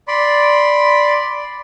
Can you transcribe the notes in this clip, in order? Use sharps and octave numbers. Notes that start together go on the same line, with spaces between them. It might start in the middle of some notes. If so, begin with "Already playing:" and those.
D5 B5 C6